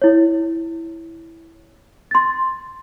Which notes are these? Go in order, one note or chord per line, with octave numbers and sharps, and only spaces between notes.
E4 C#5
C6 A6